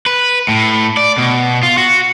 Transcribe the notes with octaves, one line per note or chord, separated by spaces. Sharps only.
B4
A2
D5
B2
F4
F#4